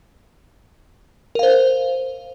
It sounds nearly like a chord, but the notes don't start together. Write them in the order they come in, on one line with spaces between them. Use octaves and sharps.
A#4 F5 C5